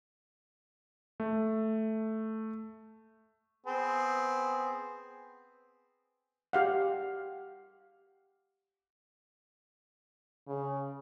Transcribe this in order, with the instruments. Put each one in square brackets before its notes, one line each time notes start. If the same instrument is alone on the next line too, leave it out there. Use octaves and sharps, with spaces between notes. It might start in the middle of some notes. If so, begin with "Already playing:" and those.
[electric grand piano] A3
[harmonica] B3 C4 G#4
[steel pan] G4 F5 F#5
[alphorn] C#3